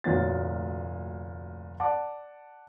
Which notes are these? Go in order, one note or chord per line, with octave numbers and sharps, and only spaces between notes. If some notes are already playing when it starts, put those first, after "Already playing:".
F1 D2 A#2 F#4 C#5 A6
D5 F#5 A5 D6